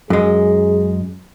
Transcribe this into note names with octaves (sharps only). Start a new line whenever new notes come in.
F#2 G#3 G#4